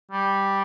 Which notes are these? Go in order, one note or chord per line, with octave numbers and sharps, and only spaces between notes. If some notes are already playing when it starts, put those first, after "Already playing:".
G3